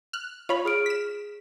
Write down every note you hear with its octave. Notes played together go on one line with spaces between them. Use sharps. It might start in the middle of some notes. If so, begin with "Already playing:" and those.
F6 F#6
F4 C#5 B5 F7
G#4 F6 D7
B6 E7